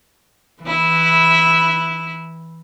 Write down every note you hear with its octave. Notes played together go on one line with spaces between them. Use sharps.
E3 E4